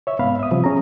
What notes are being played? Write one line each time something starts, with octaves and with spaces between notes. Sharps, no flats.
C#5 E5
C2 G#2 B3 F5 B5 F6
E5 D#6
C3 F3 G3
C#4 G#4 A#5